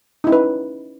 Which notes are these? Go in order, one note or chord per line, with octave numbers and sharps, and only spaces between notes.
C#4 D#4 E4 B4